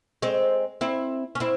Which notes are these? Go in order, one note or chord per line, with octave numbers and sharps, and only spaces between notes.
G#3 C4
C4 E4
C#4
C4 E4